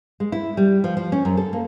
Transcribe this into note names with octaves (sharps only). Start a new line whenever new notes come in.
G#3
E4
G3
F3
F3
C#4
F#2
A4
A#3